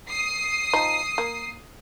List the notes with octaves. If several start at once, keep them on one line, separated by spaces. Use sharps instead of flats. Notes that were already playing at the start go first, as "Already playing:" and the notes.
D#6 C7
F3 D#4
A#3